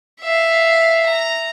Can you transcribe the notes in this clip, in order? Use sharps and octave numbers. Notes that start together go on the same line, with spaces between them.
E5 F5
A#5